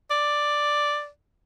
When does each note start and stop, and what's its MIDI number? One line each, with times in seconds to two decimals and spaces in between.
0.11 1.08 74